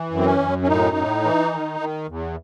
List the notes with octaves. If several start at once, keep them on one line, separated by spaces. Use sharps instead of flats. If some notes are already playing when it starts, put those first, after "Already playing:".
Already playing: E3
F#2
C4
C#4
F#2
C#4
A2 D#4
A2
E3
D#3
D#3
E2